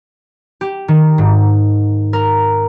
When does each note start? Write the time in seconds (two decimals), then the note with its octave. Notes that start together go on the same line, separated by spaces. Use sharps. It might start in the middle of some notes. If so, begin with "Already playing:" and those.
0.61 G4
0.88 D#3
1.18 G#2
2.13 A#4